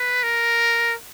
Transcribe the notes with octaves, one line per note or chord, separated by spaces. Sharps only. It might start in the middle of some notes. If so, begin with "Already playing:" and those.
Already playing: B4
A#4